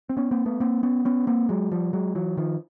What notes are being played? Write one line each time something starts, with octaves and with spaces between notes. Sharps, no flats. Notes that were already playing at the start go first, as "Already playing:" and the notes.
C4
B3 C#4
A#3 C4
A3 B3
A#3 C4
B3 C#4
B3 C#4
A#3 C4
F#3 G#3
F3 G3
F#3 G#3
E3 F#3
D#3 F3